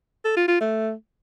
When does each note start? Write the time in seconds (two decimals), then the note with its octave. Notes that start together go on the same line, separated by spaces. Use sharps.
0.25 A4
0.37 F4
0.48 F4
0.61 A3